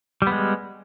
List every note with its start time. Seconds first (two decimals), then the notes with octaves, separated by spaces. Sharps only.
0.22 G3
0.27 B3
0.32 G#3